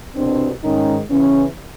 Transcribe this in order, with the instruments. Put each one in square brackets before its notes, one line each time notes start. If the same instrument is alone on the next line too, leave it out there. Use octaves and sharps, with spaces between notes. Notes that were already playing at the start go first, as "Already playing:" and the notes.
[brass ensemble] C2 B2 C4 D4
G#2 D#3 C#4 D#4
E2 C#3 E3 B3 C#4